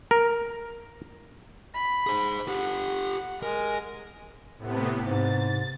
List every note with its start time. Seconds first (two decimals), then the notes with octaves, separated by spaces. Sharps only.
0.11 A#4
1.74 B5
2.07 G#4 C5
2.48 G4 A4 F#5
3.42 G#3 A#4
4.58 A2 C3 B3
5.03 G#2 C3 A6